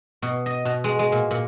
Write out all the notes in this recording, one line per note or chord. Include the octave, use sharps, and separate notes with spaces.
B2
D#5
B2
G#3
G#3
A#2
A#2